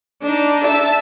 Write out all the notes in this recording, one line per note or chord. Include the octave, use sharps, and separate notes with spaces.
D4 D#4
E5 A5